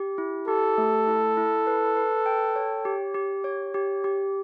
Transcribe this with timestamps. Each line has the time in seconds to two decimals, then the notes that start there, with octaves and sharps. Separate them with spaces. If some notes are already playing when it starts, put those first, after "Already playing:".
Already playing: G4
0.18 E4
0.48 G4 A4
0.78 A3
1.08 E4
1.37 E4
1.67 B4
1.97 B4
2.26 G5
2.56 C#5
2.85 G4
3.14 G4
3.44 C#5
3.74 G4
4.04 G4